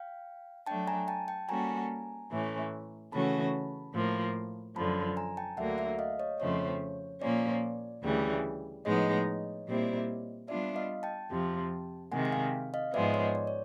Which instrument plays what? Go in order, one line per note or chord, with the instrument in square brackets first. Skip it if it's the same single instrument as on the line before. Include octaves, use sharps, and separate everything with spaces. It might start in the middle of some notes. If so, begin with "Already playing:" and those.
Already playing: [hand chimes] F5 G5
[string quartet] F#3 A3 D4 [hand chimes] G5 A5
[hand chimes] G#5 A#5
G5 A5
G5 A5
[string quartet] G3 A#3 C#4 F#4 A4 [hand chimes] G#5 A#5
[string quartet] A2 E3 A3 C#4
[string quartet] C#3 E3 A3 C#4 F#4 [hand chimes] A5 B5
[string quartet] A2 F3 A#3
[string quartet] F#2 D3 F3 [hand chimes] A5 B5
[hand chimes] G#5 A#5
G5 A5
[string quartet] D2 D3 F#3 A#3 [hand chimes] E5 F#5
[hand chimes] E5 F#5
D#5 F5
C#5 D#5
[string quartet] F2 C#3 F3 A3 C4 [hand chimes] C#5
[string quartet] A#2 F3 A#3 C#4 [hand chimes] D5
[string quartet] D2 C#3 E3 G3
[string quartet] A2 F3 G#3 B3 D#4 [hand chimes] C#5 D#5
[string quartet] A#2 G3 C4 E4
[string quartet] G3 B3 D4 F4 [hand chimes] D5 E5
[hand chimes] D#5 F5
G5 A5
[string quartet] F2 C3 F3
[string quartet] C3 D#3 G#3 [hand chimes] F#5 G#5
[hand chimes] G#5
F5 G5
D#5 F5
[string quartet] G#2 F3 G#3 B3 [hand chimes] D5 E5
[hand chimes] C#5 D#5
D5
C#5